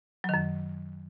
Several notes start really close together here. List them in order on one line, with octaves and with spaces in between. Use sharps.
F#3 D#3 F#2